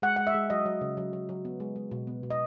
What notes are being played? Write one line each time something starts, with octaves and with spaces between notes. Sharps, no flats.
G#3 F#5
G#3 F#5
E5
G#3
F#3 D#5
F#3
C#3
F#3
F#3
F#3
B3
G#3
G#3
B2
B3
B2
D#5